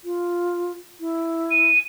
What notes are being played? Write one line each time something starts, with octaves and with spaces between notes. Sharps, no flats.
F4
E4
D#7